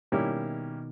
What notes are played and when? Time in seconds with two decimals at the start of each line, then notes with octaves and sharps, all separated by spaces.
0.12 B2 D#3 G3 A#3 C#4 E4